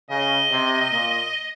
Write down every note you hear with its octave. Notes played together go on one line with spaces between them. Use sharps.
C#3 D#5
C3
A#2